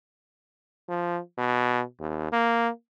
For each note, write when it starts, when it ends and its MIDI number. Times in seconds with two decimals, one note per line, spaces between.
0.89 1.19 53
1.38 1.82 47
2.00 2.29 39
2.32 2.69 58